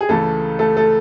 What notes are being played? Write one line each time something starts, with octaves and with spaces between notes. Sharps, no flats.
G#4
C#2 C#3 E3 A3 A4
A3 A4
A3 A4